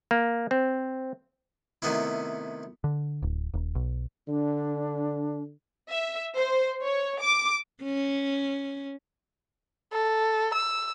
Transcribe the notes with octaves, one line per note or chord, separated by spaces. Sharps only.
A#3
C4
C3 D#3 A3 B3 C#4 E4
D3
D1
D#1
B1
D3 D4
E5
C5
C#5
D6
C#4
A4
E6